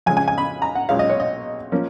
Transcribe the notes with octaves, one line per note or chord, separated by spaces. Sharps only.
F2 C#3 G#3 G#5
G#5
G#5
B5
A#5
F#5
B1 A#2 G#3 C#4 F5
D#5
C#5
D#5
F3 A#3 C#4